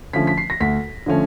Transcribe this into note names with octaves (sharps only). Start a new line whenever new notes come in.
D3 F3 A3 C#4 B6
B6
C7
A#6
D2 B6
D3 F3 A3 C#4